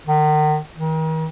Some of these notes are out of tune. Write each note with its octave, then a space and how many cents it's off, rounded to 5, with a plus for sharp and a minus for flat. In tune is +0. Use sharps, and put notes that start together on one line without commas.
D#3 -35
D#3 +40